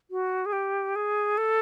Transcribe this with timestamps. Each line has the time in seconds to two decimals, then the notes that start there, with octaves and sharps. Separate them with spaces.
0.11 F#4
0.46 G#4
0.53 G4
0.96 G#4
1.38 A4